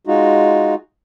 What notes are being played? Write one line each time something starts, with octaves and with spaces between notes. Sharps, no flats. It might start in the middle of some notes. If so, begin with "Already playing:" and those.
G#3 D#4 F4 F#4